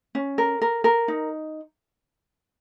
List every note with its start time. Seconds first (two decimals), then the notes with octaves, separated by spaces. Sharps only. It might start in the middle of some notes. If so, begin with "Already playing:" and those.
0.15 C#4
0.38 A#4
0.62 A#4
0.84 A#4
1.08 D#4